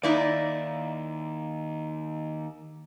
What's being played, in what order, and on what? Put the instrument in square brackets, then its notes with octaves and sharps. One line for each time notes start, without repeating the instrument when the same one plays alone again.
[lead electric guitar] D#2 [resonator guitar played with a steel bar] D#4 E4 D5